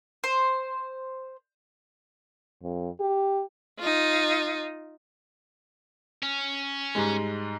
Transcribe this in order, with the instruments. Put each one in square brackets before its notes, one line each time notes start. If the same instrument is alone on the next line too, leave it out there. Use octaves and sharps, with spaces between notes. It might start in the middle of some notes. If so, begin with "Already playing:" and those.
[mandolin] C5
[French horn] F2
G4
[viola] D#4 F4
[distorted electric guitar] C#4
[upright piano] G#2 G3 G#3